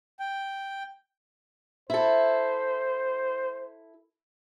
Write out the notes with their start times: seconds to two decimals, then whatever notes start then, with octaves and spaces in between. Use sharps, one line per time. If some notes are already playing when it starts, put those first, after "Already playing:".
0.19 G5
1.90 E4 A4 C5